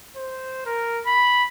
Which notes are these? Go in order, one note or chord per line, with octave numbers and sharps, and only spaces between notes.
C5
A#4
B5